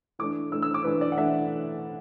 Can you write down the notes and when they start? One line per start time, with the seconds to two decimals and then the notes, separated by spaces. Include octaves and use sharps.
0.19 E3 A3 D4 D6
0.52 E3 A3 D4 E6
0.62 E6
0.74 D6
0.84 E3 A3 D4 B4
1.01 D5
1.12 F#5
1.18 E3 A3 D4 E5